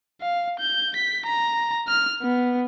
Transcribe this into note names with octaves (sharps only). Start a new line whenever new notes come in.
F5
G6
B6
A#5
F6
B3